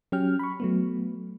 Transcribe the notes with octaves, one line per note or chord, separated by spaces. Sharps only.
F#3 C#4 G4 G5 F6
B5 C#6
F#3 A3 B3